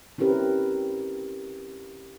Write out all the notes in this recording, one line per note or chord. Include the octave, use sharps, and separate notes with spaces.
C4 C#4 E4 G4 A#4 B4